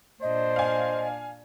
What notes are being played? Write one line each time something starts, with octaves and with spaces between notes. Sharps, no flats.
A#2 D4 C5 D#5
F5 G#5